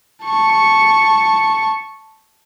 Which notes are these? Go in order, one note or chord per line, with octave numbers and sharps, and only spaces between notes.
A5 C#6